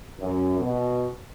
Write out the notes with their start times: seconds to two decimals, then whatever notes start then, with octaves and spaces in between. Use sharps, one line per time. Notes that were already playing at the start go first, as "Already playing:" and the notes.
0.19 F#2
0.59 B2